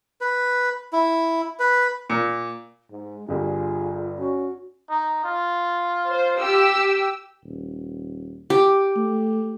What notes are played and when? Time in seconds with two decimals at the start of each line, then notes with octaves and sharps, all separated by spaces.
0.21 B4
0.93 E4
1.59 B4
2.10 A#2
2.91 G#2 G#3
3.28 G1 G2 F4 G#4
4.18 C#4 F#4
4.90 D#4
5.24 F4
6.07 C5
6.39 G4 E6
7.43 D#1
8.50 G4
8.96 A3